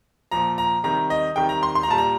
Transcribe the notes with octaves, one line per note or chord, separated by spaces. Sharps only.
A#2 F3 A#5
A#5
C3 D#3 G3 A#5
D#5
C3 D#3 G3 G5
A#5
C6
C6
A#5
A#2 G3 A5
A#5